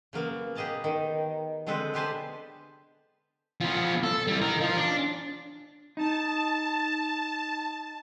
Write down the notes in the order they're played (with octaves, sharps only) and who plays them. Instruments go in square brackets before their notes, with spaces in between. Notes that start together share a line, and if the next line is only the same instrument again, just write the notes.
[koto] C#3 F#3 A#3 B3
B3 G4 G#4 D#5 A5 A#5
D#3
D3 G#3 C4 A4 B4 C5
B3 G4 B4 C5 G#5 A5
[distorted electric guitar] F3 B3
A4
G3 E4
D#4 A#4
F3
D4
[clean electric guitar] D#4 [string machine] A5